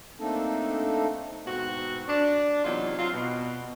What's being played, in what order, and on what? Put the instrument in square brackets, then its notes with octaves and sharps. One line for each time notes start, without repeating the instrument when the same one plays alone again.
[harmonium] A3 A#3 C4 D4 D#4 A4
[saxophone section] G#2 B2 C4 F#4
D4
E2 C3 F#3 D#4 F4
F#3 C4 F4
B2